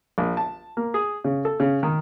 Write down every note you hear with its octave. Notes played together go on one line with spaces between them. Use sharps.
A#1
A5
A#3
G#4
C#3
A4
C#3
D#3